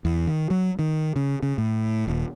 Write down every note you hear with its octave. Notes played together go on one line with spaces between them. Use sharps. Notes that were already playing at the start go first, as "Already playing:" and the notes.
E2
D#3
F#3
D#3
C#3
C#3
A2
D#1